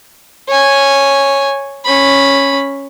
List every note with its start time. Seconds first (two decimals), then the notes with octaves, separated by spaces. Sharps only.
0.48 C#5 G#5
1.85 C#4 B5